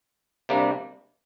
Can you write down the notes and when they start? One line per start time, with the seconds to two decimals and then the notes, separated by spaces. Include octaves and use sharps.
0.49 C3 G3 A#3 D4